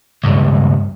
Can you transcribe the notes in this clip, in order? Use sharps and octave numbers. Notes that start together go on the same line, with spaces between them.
C#2 G2